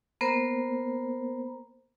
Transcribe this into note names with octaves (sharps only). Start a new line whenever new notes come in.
A#3 B3 A#4 C5